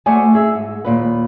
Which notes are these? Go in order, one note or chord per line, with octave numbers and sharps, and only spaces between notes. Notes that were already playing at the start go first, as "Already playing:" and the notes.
A3 F#4 C5 D5 D#5 G#5
D#4 G#4 E5
G#2
D#2 A#2 B4